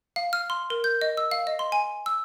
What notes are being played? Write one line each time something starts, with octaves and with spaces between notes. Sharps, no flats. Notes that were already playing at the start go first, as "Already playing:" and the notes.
F5
F6
C6
A#4
G6
D#5
E6
F5
D#5
C6
G#5
E6